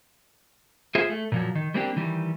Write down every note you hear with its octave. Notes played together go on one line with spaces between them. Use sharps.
F4 G#4 C5 E5
A3
A#2 F3 F#3
D#3
G3 A#3 C4 D4 F#4 G4
D#3 E3 G3